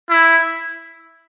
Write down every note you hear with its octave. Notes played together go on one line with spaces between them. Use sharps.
E4